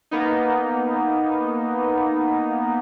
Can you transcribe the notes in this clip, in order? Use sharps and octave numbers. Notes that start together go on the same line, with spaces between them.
A#3 B3 D#4